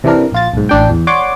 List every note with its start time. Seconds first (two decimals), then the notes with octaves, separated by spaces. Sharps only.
0.04 C3 E3 D4 A#4
0.32 A#1 F4 A6
0.53 B1 G#2
0.69 A1 D4 G5
0.90 E2
1.07 C#5 D5 F#5 C6 D6